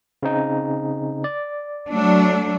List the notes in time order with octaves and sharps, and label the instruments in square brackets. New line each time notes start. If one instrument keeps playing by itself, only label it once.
[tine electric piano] C#3 C4 D#4
D5
[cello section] F#3 A3 D4